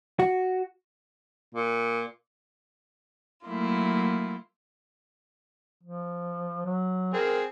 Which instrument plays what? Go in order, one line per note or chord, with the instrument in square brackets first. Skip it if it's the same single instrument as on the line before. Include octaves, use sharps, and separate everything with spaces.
[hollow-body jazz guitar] F#4
[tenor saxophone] A#2
[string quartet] F#3 A3 A#3 E4 F4
[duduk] F3
F#3
[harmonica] C4 G#4 [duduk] A#4